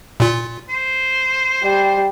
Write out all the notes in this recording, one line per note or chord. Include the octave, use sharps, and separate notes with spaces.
A#2 F4
C5
G3